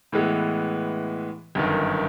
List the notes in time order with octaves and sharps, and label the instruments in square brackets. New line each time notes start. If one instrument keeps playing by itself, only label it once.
[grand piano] A2 E3 G#3 B3
G1 F#2 D#3